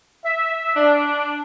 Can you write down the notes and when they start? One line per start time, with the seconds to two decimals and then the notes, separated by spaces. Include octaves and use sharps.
0.25 E5
0.76 D4